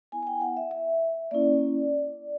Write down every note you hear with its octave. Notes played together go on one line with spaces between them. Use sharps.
B3 E4 G#5
G#5
G5
F#5
E5
E5
A#3 C#4 E4 D5